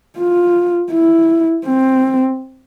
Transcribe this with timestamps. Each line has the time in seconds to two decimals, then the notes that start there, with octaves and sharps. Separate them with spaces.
0.17 F4
0.92 E4
1.66 C4